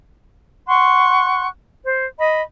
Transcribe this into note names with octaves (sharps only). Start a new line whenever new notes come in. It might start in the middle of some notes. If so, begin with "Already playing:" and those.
F#5 C6 C#6 F#6
C5
D#5 B5